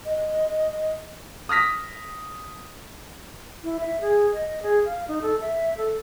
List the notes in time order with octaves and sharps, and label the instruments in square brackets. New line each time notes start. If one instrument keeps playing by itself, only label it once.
[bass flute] D#5
[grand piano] D#6 F6 A#6 B6
[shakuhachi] E4
E5
G#4
D#5
G#4
F5
D#4
A4
E5
A4